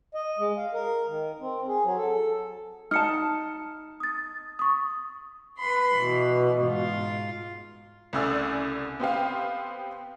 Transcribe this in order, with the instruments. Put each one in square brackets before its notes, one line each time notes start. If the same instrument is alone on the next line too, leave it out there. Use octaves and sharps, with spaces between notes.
[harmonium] D#5
G#3
F5
A#4
D#3
C4
G#4
F#3
A4
[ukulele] D#4 A5 [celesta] F6 C#7
[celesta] D#6 A6
C#6 D#6
[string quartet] B4 B5 C6
[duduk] B2 [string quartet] E3
[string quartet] G#2 F4
[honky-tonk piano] C2 C#3 A3 D5 G#5 E6
B3 C4 G4 F5